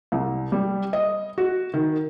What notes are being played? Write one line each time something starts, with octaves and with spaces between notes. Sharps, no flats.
C2
G3
D#5
F#4
D#3